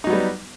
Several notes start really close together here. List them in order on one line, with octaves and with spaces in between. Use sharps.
D#4 F#3 B3 G3